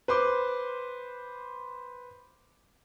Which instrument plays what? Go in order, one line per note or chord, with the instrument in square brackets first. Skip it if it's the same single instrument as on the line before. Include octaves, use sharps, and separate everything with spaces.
[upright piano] B4 C5 C6 D6